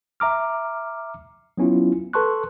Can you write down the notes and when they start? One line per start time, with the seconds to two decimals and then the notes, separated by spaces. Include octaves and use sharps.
0.20 E5 A#5 D6 F6
1.57 F#3 B3 C#4 E4 F4
2.13 A4 B4 A5 C6 C#6 F#6